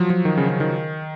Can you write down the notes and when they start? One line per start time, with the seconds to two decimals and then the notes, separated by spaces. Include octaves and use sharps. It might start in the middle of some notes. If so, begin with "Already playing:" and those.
Already playing: F3 F#3
0.10 F3
0.25 D#3
0.38 C#3
0.49 C#3
0.60 D#3